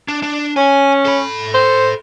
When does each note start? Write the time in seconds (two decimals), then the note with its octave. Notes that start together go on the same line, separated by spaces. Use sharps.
0.08 D4
0.23 D4
0.56 C#4 G#5
1.05 A4 B5
1.54 C5